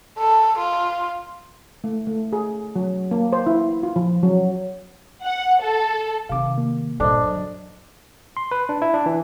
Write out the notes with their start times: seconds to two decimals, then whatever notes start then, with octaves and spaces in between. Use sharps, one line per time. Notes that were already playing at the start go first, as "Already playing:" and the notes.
0.18 A4
0.58 F4
1.84 A3
2.07 A3
2.33 G#4
2.76 F#3
3.11 A#3
3.33 C5
3.46 E4
3.83 F4
3.96 F3
4.23 F#3
5.24 F#5
5.61 A4
6.29 C3 D#3 F5 D6
6.58 A#3
7.00 G2 A#2 D4 A4 C5 D#5
7.23 F#2
8.37 C6
8.51 B4
8.69 D4
8.82 E4
8.94 D4
9.06 E3